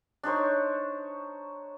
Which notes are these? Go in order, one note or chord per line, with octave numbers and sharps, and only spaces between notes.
D4 D#4 C5 C#5